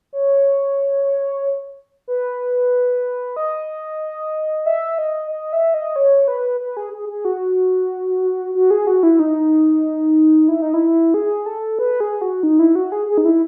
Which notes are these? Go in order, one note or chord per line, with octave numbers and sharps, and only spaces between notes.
C#5
B4
D#5
E5
D#5
D#5
E5
D#5
C#5
B4
B4
G#4
G#4
G#4
F#4
F#4
G#4
F#4
E4
D#4
E4
D#4
E4
G#4
A4
B4
G#4
F#4
D#4
E4
F#4
G#4
G#4
D#4
E4